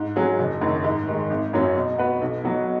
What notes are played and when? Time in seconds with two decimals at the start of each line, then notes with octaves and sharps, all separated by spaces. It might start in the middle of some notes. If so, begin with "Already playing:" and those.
Already playing: G#2
0.16 F#3 C#4 G#4
0.39 F#1
0.61 F#2 D#3
0.84 G#2
1.07 D#3 G#3
1.30 G#1
1.53 F#2 F#3 C#4
1.76 B2
1.98 B3 F#4 B4
2.21 B1
2.44 B2 F#3 B3 F#4